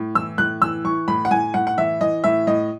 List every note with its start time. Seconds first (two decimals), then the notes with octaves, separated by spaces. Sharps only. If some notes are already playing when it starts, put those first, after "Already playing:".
Already playing: A2
0.15 E3 E6
0.38 A2 F#6
0.62 E3 E6
0.84 E3 C#6
1.08 A2 B5
1.25 F#5
1.31 A2 G#5
1.54 A2 F#5
1.67 F#5
1.78 E3 E5
2.01 E3 D#5
2.24 A2 E5
2.47 A2 D#5